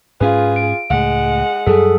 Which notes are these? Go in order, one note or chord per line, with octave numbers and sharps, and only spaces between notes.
G#2 C#4 F4 G#4 B4
D7
C#2 A2 G#3 F#5
F#2 F#3 G3 G#4 A4